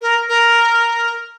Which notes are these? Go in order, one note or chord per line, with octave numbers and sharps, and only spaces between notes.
A#4
A#4